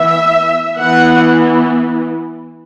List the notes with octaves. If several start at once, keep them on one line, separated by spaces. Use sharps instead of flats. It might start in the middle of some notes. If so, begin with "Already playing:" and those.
Already playing: E3 B3 E5
E3 B3 F#5